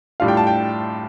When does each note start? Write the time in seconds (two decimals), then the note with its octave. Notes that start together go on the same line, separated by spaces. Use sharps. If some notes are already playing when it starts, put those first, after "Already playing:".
0.20 A2 G3 D4 F4 F5
0.28 G5
0.37 A5
0.47 G5